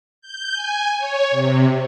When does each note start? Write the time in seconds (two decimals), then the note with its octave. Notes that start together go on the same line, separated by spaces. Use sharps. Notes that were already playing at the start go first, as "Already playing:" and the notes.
0.21 G6
0.53 G#5
0.98 C#5
1.31 C3